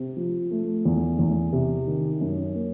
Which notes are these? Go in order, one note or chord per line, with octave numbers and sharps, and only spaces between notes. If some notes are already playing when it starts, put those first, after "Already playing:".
Already playing: C3 C4
F3
A3
E2
E2
C3
D#3
F#2
A#3